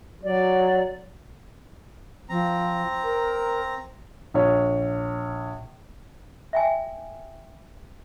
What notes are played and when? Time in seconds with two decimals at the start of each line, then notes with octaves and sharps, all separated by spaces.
0.24 F#3 D5
2.29 F3 C4 A#5
3.04 A#4
4.34 A#1 C#5
6.53 E5 G5 G#5